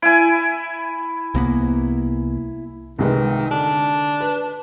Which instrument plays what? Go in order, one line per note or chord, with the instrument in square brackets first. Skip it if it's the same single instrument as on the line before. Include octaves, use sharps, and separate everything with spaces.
[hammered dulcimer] E4 G#5
[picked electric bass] C2 A#3 B3
[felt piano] C2 G#3 B4 [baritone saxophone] D#3
[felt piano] D3 [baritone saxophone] D4
[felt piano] B4